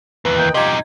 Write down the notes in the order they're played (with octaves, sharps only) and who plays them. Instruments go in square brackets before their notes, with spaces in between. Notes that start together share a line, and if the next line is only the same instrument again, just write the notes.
[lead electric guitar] D#2 E3 [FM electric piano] B4
[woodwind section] A#4 D#5 G5
[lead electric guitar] C3 D#4 [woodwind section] F4 G4 [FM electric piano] D#5 G#6